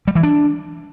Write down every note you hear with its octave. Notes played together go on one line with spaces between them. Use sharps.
G3
E3
D4